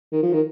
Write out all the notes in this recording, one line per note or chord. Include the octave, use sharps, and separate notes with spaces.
D#3
F3
D#3